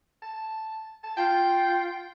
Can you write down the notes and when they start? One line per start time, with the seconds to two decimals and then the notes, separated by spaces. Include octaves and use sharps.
0.22 A5
1.03 A5
1.17 F4 G5